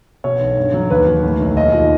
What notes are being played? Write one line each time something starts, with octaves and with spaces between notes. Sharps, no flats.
B2 C#5
B1
G2
F#3
D#2 B4
F#3
A2
B1
D#2 D#5
F3